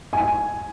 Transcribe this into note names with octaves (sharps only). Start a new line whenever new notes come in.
G#5